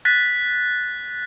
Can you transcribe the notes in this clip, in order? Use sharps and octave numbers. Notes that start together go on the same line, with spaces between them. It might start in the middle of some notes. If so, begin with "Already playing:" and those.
F#6 A6 B6